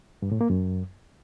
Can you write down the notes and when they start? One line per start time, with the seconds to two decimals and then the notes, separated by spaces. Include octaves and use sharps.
0.22 G2
0.31 A2
0.41 A#3
0.50 F#2